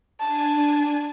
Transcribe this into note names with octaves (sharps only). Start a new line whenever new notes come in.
D4 G#5 A5